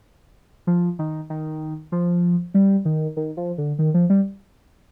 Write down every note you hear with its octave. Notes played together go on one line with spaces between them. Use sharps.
F3
D#3
D#3
F3
G3
D#3
D#3
F3
D3
D#3
F3
G3